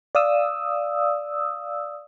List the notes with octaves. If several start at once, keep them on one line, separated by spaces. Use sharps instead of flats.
D5 F5 D#6 E6